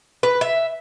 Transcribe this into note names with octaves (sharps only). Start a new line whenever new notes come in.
B4
E5